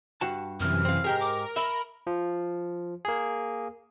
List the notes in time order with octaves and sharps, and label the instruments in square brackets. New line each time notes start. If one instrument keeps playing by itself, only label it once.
[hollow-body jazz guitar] G2 F#4 A5
[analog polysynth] F#2 C3 E3 [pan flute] F6
[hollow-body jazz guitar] C4 F5
[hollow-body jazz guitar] G#2 G4 G#4 [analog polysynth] A#4
[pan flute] D6
[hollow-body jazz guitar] E5 [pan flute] B5
[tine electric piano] F3
A#3 G#4